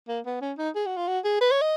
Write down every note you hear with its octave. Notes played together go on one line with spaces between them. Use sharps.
A#3
B3
C#4
D#4
G#4
F#4
F4
F#4
G#4
B4
C#5
D#5